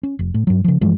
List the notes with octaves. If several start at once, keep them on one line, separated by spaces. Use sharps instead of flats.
C#4
F1
A2
G2 F#3
C#3 F3
G2 E3 F3 G#3